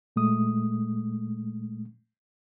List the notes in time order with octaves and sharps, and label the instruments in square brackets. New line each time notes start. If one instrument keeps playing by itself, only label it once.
[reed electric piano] A#2 G#3 A3 D#6